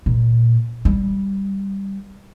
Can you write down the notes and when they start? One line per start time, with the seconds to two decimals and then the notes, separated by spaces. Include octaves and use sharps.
0.06 A#2
0.85 G3